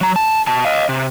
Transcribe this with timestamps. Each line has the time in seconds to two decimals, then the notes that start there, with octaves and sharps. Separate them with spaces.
0.01 F#3 A#5
0.16 A5
0.47 B2 A5
0.65 D#5 F5
0.89 C3